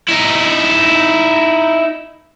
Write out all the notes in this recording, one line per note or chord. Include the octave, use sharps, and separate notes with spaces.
D#4 E4